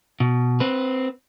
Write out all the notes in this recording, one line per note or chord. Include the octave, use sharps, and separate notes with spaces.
B2
C4 B4